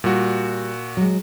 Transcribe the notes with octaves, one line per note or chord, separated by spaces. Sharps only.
A#2 G3 F#4
F#3 G#3